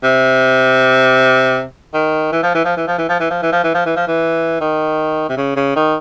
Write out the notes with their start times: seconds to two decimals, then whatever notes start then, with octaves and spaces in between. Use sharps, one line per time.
0.03 C3
1.94 D#3
2.32 E3
2.43 F3
2.55 E3
2.65 F3
2.77 E3
2.87 F3
2.98 E3
3.09 F3
3.20 E3
3.30 F3
3.42 E3
3.52 F3
3.64 E3
3.74 F3
3.86 E3
3.96 F3
4.07 E3
4.61 D#3
5.29 C3
5.37 C#3
5.56 C#3
5.75 D#3